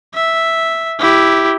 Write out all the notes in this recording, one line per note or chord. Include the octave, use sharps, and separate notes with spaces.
E5
E4 G4